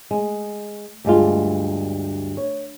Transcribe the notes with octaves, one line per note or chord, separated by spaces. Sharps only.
G#3
D2 G2 G#3 F4
C#5